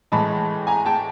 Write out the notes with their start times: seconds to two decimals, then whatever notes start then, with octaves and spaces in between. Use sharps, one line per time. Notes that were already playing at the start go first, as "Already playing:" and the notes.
0.12 A2 E3 G#3 A5 B5
0.67 G#5 A#5
0.86 G5 A5